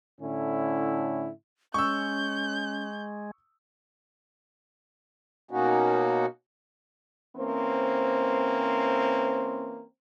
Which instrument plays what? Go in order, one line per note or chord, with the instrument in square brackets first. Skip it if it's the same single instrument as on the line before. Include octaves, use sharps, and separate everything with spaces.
[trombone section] A2 D3 C#4 E4
[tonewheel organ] G#3 [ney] C#4 [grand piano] C#6 E6 [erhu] G6
[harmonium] B2 A#3 C#4 D#4 F#4
[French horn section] E3 A#3 C4 C#4 C5